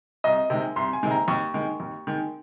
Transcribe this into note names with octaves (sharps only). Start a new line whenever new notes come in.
C2 D#5
C3 D#3 G#3
C2 C6
G#5
C3 D#3 G#3
A#5
D#2 C#6
D#3 G#3
D#2
D#3 G#3